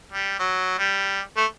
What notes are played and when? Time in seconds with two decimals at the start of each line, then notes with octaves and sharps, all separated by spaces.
0.12 G3
0.39 F#3
0.79 G3
1.37 A3